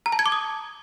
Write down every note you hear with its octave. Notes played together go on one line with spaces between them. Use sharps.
A#5
A5
G#6
D6
D#6